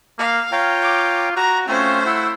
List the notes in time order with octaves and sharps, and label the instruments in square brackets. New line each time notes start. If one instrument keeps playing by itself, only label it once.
[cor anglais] A#3 [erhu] F5
[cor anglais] F4 [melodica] C#5 G5 A#5
[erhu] D6
[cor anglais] F#4 [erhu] A#5
[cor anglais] A3 [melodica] C4 F4 [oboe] C#4 [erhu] C5
[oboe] E4 [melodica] F#5 E6